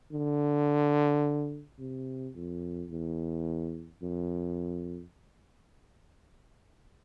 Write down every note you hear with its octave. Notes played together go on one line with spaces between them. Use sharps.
D3
C3
F2
E2
F2